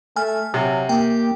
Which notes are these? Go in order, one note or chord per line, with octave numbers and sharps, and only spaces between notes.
A3 G#5 F6
C3 F#3
A#3 G4 G5